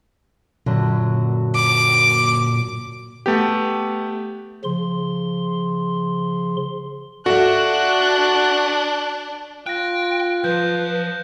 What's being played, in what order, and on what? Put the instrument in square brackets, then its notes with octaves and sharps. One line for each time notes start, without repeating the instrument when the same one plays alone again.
[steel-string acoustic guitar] F#2 D3 F#3 [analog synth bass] A#2
[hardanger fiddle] D6
[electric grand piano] A3 B3 G4
[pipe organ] C#3 F3 C6
[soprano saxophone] D4 [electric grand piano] F#4 [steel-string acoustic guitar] A4 E5 F5 [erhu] F#6
[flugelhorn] F4 [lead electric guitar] G5 [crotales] F#6 A#6
[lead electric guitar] F3 [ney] B4 [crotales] G6